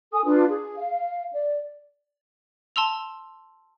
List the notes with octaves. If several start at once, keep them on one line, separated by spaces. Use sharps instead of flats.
A4 G#5 D#6
D4 F4 B4
G#4
F5
D5
A5 C6 E6 F7